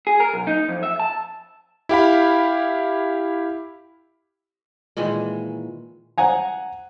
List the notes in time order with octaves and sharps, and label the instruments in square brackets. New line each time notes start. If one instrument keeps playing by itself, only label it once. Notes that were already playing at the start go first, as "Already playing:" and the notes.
[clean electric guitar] G#4
A#4
B1
D#4
F2
E5
A5
[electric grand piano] E4 G4 F5 B5
[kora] A#2 D#3 E3 G#3
[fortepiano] C5 F#5 G#5 A#5